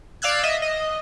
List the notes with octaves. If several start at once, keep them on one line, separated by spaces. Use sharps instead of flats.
D5 F5 E6 F#6 G#6
D#5 E5
D#5